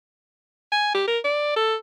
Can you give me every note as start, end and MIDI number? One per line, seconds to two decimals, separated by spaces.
0.72 0.94 80
0.95 1.05 67
1.08 1.19 70
1.24 1.55 74
1.56 1.75 69